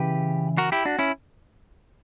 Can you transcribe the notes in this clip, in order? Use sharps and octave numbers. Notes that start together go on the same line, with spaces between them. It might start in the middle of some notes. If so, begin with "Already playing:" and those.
Already playing: C#3 E3 G4 B4
F#4 A#4
E4 G4
D4 F#4
C#4 E4